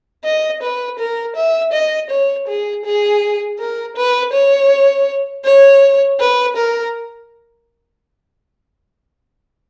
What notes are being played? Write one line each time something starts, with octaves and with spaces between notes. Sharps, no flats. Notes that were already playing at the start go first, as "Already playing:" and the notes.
D#5
B4
A#4
E5
D#5
C#5
G#4
G#4
A#4
B4
C#5
C#5
B4
A#4